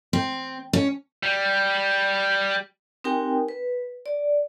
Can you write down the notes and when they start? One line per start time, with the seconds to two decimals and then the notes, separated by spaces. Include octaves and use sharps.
0.13 C4
0.73 C#4
1.23 G3
3.04 C4 D#4 G4 A#4 G5 G#5
3.48 B4
4.06 D5